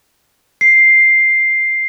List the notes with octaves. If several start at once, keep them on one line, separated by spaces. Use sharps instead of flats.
C7